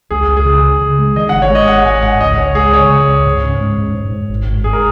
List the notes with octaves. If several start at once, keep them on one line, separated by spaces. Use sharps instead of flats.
C#2 G#4
C#2
G#4
C#3
C#3
C#3
G#3
D#3 D#5
F#5
G#1
C#5
G#3
D#5
G#1 F#5
G#1 G#5
G#2 F#5
C#2 D#5
C#2 C#5
G#3 G#4
C#3 C#5
C#3
C#2
G#2
C#4
G#3
G#2
G#2
G#2
G#1
G#1
G#2 G#4
A#4